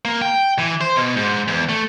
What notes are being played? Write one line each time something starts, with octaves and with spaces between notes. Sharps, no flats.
A#3
G5
E3
C5
B2
G#2
E2
A3